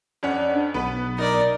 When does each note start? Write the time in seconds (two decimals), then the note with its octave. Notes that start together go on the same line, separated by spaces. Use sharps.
0.23 F2 C#4 D4 F#5
0.74 B1 B3 B4
1.18 D#4 A#4 D5